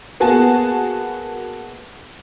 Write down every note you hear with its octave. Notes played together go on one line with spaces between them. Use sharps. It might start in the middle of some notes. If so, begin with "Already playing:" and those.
A#3 B3 F#4 G#4 G#5 A5